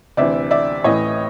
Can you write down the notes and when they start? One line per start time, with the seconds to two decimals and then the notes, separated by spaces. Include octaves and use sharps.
0.17 D2 C3 E3 D5 E5
0.51 D5 E5
0.84 A1 A2 E3 C#5 D#5